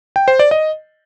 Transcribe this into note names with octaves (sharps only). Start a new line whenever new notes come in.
G5
C5
D5
D#5